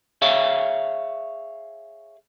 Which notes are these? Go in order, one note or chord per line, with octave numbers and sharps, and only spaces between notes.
G#4 C#5 E5 F5